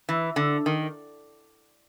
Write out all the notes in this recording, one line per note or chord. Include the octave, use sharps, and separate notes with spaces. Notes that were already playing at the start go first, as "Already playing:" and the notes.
E3
D3
D#3